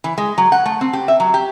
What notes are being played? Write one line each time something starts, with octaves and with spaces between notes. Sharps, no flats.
E3
G#3
F#3
F#5
A3
C4
G4
E5
F#3
G4